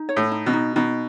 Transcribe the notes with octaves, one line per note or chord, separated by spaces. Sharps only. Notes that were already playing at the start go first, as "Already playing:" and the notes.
Already playing: D#4
C#5
A2
D#4
B2
D#4
B2 D#4